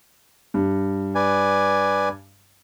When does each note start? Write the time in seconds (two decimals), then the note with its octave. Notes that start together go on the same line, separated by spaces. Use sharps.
0.54 G2
1.15 B4 D5 G#5